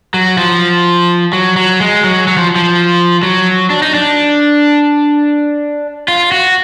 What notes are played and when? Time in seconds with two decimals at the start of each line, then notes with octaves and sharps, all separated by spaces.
0.14 F#3
0.38 F3
1.33 F#3
1.56 F#3
1.80 G#3
2.04 F#3
2.28 F#3
2.37 F3
2.56 F3
3.23 F#3
3.70 D4
3.82 D#4
3.94 D4
6.08 F4
6.32 F#4